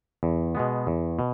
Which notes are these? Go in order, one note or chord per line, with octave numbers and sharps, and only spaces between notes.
E2
B2 G#3 B3
E2
B2